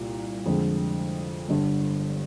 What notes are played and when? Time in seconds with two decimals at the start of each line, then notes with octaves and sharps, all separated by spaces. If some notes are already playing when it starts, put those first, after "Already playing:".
Already playing: C2 A#2
0.46 F2 D3 G#3
1.48 G1 G2 D3